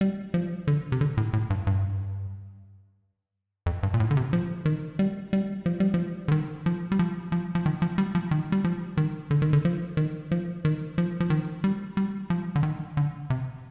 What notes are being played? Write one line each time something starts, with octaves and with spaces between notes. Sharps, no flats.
G3
F3
D3
C3
D3
A2
A2
G2
G2
F2
G2
A#2
A2
D3
C3
F3
D#3
G3
G3
F3
G3
F3
D3
D#3
F3
G3
F3
F3
F3
D#3
F3
G3
F3
D#3
G3
F3
D#3
D3
D#3
D3
F3
D#3
F3
D#3
F3
F3
D#3
G3
G3
F3
D3
D#3
D3
C3